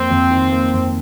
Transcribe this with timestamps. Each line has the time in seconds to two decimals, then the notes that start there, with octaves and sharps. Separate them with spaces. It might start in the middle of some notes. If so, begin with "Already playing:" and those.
Already playing: F2 A#3 C4
0.10 F2
0.31 D#3
0.52 A#3
0.73 F2